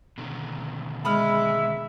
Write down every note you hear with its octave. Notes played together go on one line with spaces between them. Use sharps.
B2 D3 D#3
G#3 E5 B5 D#6 F6